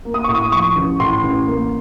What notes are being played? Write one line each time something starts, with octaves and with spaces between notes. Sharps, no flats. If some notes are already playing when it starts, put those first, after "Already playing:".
A#3
D#6
A2 C#6
D#6
F3 C#6
A1
A2 C6
A1
A#3